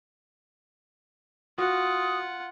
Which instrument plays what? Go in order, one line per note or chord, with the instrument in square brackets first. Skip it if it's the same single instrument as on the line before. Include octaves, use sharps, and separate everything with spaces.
[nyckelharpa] F4 F#5 [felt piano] F#4 [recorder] D#6